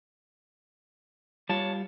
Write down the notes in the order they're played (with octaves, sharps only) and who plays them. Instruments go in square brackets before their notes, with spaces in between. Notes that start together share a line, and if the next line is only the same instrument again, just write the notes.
[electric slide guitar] G3 F4 [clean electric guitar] C#5 A5